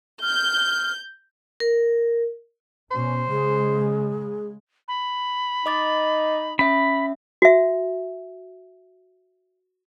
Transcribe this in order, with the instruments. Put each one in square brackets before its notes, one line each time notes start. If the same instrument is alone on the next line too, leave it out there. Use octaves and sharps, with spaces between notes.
[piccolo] F6 [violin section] G6
[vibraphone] A#4
[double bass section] B2 C#4 [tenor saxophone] C5
[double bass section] C#3 G#3 [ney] G#4
[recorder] B5
[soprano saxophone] D#4 [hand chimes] D#5 D6 A6
[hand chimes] C#4 E5 [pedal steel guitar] B5
[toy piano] F#4 E5